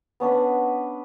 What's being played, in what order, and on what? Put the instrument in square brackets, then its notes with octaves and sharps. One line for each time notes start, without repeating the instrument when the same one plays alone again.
[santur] B3 C#4 D4 B4